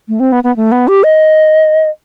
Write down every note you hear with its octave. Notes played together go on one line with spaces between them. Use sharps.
A3
C4
B3
B3
A3
B3
G4
D#5